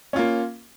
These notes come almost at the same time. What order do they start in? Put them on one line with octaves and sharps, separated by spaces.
C#4 F4 A#3